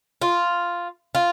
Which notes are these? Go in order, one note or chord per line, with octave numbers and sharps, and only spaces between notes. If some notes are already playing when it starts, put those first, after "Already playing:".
F4
F4